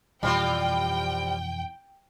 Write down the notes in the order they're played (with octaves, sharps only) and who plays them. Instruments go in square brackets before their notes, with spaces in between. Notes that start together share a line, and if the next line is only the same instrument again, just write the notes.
[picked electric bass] F2 B2 E3 [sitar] G3 C4 F4 [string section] G5